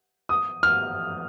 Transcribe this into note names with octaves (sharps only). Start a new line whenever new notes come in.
D#6
F6